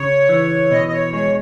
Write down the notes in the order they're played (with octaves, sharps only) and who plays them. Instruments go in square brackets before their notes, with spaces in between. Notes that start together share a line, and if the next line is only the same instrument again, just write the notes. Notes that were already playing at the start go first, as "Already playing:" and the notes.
Already playing: [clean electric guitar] C#3 [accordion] C#5
[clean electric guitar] E3
[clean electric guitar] B2 [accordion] D#5
[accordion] D#5
C#5
[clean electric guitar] G#3 [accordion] C#5